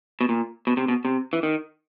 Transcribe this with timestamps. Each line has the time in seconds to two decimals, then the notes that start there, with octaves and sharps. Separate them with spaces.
0.21 B2
0.29 A#2
0.67 B2
0.77 C3
0.88 B2
1.05 C3
1.33 E3
1.43 D#3